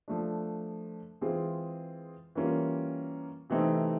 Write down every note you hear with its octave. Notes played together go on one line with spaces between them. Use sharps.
F3 A3 D4
E3 G#3 C4 F4 G#4
E3 G3 A#3 C#4 F4
C3 E3 A3 C4 D#4